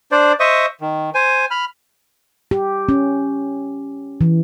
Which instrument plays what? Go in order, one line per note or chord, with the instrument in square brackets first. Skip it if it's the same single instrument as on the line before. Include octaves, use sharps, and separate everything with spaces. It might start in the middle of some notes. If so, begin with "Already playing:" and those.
[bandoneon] D4 C5 D5
C5 D#5 E5 C#6 D#6
D#3
C5 G#5
B5 F6
[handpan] G4
C#4
E3